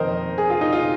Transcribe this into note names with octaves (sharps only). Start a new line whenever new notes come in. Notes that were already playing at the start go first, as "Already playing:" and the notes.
Already playing: F2 D#3 A#4 C5 D#5
G#4
F4
D#4
F4